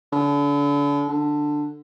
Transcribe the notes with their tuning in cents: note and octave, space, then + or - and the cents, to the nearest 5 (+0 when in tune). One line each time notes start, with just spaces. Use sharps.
D3 -35
D3 +10